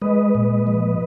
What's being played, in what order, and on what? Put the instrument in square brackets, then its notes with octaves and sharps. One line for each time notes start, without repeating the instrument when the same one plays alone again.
[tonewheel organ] G#3 B4 D#5
A#2
F3